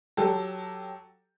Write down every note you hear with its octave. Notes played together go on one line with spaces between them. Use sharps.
F#3 G4 A4